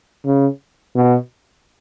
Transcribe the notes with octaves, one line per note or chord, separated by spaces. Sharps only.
C#3
B2